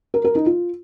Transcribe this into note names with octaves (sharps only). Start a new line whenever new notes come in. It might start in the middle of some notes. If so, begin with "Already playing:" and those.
A#4
A#4
D#4
F4